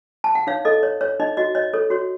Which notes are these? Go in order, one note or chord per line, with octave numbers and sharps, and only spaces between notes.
A5
F#5
D#4 C#5 F5
A4 D#5
C#5
C#5
D#4 D#5
F#4 D#5
C#5 D#5
A4 C#5
F#4 C#5